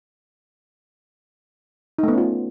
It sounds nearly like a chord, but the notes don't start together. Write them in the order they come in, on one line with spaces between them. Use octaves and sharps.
D#4 A3 B3 C#4 F4